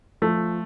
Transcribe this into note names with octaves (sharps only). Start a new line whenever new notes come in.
F3 A3